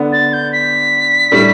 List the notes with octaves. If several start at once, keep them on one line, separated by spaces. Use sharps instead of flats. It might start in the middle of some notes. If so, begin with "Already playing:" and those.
Already playing: D3 B3 D4
A6
G6
B6
A2 G3 D4